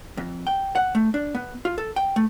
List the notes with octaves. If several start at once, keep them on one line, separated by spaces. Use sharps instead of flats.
F2
G5
F#5
A3
D4
B3
F4
A4
G5
A3